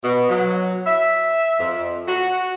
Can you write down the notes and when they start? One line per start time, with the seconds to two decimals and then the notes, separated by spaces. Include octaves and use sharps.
0.04 B2
0.30 F#3
0.87 E5
1.60 F2
2.08 F#4